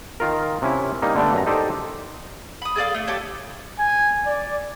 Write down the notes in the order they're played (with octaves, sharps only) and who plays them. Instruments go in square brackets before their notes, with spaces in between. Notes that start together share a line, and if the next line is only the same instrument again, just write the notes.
[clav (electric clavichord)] D#3 F4 A#4
C3 C#4 E4
G3 A#3 D#4
D3 G3 A3 B3 D4
F#2 A#5
D#4 G4 A4 C5 D5
[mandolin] B5 D#6
G#4 A4 D5 F5
A3
G4 A4 C#5
[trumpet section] G#5
D5